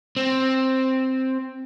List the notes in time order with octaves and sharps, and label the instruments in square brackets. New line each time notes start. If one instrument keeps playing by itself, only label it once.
[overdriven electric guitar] C4